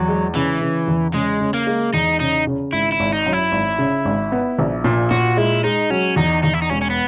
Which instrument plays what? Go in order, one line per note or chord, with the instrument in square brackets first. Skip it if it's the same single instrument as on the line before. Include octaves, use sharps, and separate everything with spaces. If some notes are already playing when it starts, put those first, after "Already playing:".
Already playing: [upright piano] E2 [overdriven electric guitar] F#3
[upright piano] G#3
[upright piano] C#3 [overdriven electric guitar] E3
[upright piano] C#3
E2
[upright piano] C#3 [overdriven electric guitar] G#3
[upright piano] C#3
[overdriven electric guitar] A#3
[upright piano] G#3
[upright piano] E2 [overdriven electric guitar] D#4
[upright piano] C#3 [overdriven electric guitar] D#4
[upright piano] C#3
[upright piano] G#1 [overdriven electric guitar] E4
[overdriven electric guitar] E4
[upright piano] G#1
[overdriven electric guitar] D#4
[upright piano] F#2
[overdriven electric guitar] E4
[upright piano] G#1
C#3
G#1
B3
A#1
A#2
[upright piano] A#2 [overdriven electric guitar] F#4
[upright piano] G#3 [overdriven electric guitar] E4
[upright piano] G#3 [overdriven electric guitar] D#4
[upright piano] F#3 [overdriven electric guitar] C#4
[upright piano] E2 [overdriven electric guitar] D#4
[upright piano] E2 [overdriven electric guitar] D#4
[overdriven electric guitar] E4
D#4
[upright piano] E1 [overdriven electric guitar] C#4
[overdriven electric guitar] C#4
B3